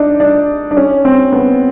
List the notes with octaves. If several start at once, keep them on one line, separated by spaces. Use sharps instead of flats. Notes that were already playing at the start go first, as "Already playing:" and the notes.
Already playing: D4 D#4
D4
D4
C#4
C4
B3